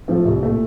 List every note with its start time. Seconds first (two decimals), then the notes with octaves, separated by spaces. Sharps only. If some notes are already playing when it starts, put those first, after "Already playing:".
0.08 F3 A3
0.25 C2
0.43 A#2 A3